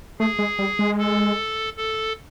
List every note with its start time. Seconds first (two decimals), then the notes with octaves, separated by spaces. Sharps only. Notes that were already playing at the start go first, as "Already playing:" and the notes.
0.19 A3 G#4
0.39 G#3
0.59 G3
0.79 G#3
0.98 A4
1.77 A4